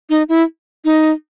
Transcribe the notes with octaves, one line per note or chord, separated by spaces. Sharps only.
D#4
E4
D#4